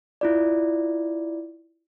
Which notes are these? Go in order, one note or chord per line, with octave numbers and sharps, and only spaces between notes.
E4 F4 D5